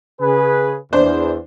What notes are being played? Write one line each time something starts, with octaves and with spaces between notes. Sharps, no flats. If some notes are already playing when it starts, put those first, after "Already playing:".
C#3 G#4 B4
E2 D4 C5